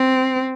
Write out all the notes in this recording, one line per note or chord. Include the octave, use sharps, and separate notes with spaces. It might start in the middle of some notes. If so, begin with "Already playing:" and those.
Already playing: C4